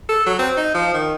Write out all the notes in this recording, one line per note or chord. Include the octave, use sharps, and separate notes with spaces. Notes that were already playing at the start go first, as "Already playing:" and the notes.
A4
F#3
C4
D#4
F3
D#3